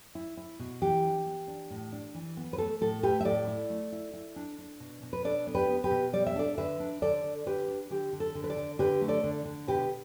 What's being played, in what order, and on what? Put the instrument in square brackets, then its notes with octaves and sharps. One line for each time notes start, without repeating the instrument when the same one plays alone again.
[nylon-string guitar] E4
E4
B2
E3 G4
D4
B3
D4
A2
D4
E3
B3
B4
A3 A4
A2 A4
A3 G4 B4
E5
A2 A4 D5
E4
A3
E4
E4
D4
D4
B2
B2
B4
D4 A4 D5
B3
G4 B4
B3
G4 B4
B2
G3 D5
E5
D4 A4 D5
D3 B4 E5
D4
D3 A4 D5
D3
D3 G4 B4
D4
D3 G4
D3
A4
D3
B4
A4 D5
D3
D3 G4 B4
A3
A4 D5
D3
D3
B2 G4 B4